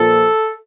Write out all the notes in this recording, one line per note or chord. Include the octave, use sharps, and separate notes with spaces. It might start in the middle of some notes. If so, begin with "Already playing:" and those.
Already playing: A#2 F3 A4